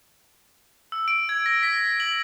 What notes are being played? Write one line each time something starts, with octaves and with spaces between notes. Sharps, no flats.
E6
D7
G#6
A#6
B6
F#7